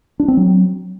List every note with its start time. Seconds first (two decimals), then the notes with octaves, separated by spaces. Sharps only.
0.20 D4
0.28 C4
0.37 F#3